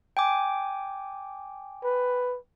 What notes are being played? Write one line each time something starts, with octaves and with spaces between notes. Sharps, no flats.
G5 G#5 D6
B4